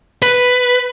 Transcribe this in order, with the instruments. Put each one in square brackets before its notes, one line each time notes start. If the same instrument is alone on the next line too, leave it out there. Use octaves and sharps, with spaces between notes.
[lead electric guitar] B4